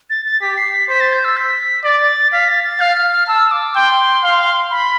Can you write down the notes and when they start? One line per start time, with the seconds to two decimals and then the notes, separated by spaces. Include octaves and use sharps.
0.10 A6
0.26 A6
0.41 G4 B6
0.58 C7
0.73 B6
0.89 C5 B6
1.00 A6
1.13 G6
1.25 E6
1.37 B6
1.84 D5 A6
2.32 F5 B6
2.49 A6
2.64 A6
2.80 F5 F6
3.28 A5 E6
3.51 D6
3.76 G5 C6
4.23 F5
4.71 B5